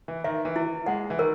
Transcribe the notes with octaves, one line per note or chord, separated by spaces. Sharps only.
E3
D#3 E5
E3
E4
G#3 F#5
E3
D#3 A#4